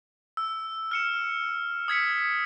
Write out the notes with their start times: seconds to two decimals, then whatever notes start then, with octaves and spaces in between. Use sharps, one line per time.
0.37 E6
0.91 F6 C#7 E7
1.88 D#6 G#6 B6 C#7